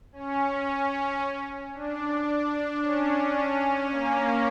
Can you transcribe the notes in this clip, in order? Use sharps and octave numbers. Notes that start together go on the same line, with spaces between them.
C#4
D4
C#4
C#4
A#3